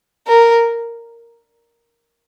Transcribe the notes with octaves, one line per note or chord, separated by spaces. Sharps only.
A#4